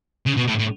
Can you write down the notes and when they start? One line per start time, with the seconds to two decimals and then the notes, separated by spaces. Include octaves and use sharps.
0.26 C#3
0.37 B2
0.47 A2
0.59 A2